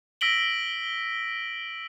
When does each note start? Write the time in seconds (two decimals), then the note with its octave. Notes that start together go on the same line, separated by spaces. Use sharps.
0.21 E6 A#6 B6 D7 F#7 G7